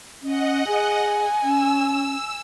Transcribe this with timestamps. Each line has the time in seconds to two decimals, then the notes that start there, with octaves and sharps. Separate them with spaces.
0.23 C#4 D#5 F#5
0.67 G#4 G#5
1.43 C#4 E6